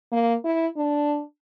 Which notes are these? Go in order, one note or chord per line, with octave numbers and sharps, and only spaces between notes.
A#3
E4
D4